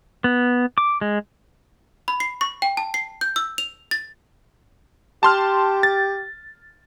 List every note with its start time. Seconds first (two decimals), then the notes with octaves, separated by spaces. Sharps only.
0.24 B3
0.78 D6
1.01 G#3
2.08 B5
2.20 C7
2.41 C#6
2.62 G5
2.77 A5
2.94 C7
3.21 G6
3.36 E6
3.58 F7
3.91 A6
5.23 G4 A5 C6 F6
5.83 A6